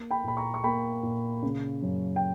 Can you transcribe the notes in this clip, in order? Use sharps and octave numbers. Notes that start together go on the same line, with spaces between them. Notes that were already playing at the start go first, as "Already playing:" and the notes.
Already playing: A#3
G5 B5
A#2 B5
A#5 C#6
C#6
A#3 G5 B5
A#2
C#3
F#2
G5